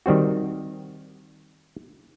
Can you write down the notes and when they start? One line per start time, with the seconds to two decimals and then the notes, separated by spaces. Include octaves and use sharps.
0.06 D#3 G3 C4 F#4